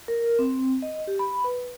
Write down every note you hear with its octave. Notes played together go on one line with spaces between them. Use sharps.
A#4
C4
D#5
G4
B5
B4